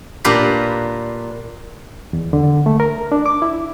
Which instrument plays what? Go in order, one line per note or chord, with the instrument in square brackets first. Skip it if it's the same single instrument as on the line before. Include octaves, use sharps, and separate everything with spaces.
[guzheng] A#2 D4 G4 A#4 B4
[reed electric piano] E2
D3
A3
A#4
D4
D6
E4